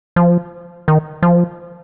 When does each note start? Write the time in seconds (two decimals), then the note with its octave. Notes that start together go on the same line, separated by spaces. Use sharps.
0.16 F3
0.88 D#3
1.22 F3